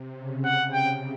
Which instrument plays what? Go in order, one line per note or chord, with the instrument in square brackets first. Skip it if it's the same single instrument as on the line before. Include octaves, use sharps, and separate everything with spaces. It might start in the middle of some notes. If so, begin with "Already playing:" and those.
Already playing: [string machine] C3
C#3
[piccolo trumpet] F#5
G5